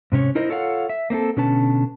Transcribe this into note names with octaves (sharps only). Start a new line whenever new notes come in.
G#2 C3 C#4 C#5
D#4 E4 A#4 C5 D#5
F4 A4 C#5 D#5 F5 F#5
E5
A#3 C4 D4 A4
B2 D3 C#4 B4 A5